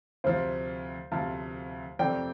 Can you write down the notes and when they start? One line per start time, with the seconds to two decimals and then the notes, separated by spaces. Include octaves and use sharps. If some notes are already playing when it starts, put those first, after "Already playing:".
0.24 D2 C3 F3 C5 F5
1.12 D2 C3 F3 F5 A5
1.99 F2 C3 F3 A3 C4 D5 G5